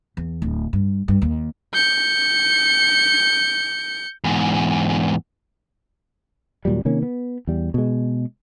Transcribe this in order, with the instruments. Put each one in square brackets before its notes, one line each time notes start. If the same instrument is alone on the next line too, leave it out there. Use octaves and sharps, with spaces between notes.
[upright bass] E2
D1
G2
G2
D#2
[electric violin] G6 C#7
[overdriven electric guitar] E2 G#2
[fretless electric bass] D#2 A#2 F#3 G3
C3 D#3 A#3 C#4
B3
E2 G3
B2 G#3